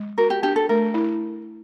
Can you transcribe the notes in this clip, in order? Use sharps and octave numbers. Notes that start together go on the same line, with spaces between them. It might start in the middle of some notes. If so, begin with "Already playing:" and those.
Already playing: G#3
F#4 A#4
G4
D4 G4
A4
A3 A#4
E4